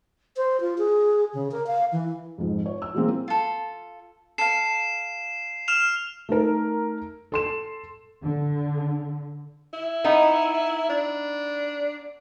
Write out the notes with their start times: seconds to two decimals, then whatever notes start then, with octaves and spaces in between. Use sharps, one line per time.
0.37 C5
0.61 F4
0.78 G#4
1.34 C#3
1.52 A#4
1.67 F5
1.92 E3
2.38 F2 G#2
2.66 C#5
2.82 E6
2.94 E3 F#3 G#3 A#3 C4
3.28 F4 A4
4.38 A4 F5 C7 E7
5.68 F6 E7 F7
6.29 A3 D#4 A#4
7.32 A4 C6 E7
8.21 D3
9.73 E4
10.04 B3 D#4
10.89 D4